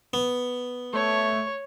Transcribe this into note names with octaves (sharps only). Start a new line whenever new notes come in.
B3
A3 C#5